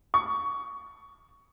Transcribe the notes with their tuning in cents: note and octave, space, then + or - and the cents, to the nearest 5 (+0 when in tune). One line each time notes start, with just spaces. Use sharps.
C#6 +15